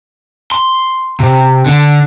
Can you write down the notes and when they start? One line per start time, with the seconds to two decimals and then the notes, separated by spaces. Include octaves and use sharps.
0.52 C6
1.20 C3
1.66 D3